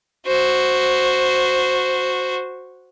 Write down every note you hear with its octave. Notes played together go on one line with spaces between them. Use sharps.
F#4 C5